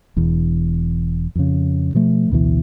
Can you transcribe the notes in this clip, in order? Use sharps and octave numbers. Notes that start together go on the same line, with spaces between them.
E1 E2
F2 C#3
B2 F3 A3
A1 D2 B2 E3